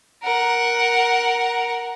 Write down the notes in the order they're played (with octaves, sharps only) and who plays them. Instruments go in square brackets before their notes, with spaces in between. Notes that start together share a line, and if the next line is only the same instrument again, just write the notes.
[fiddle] A#4 F#5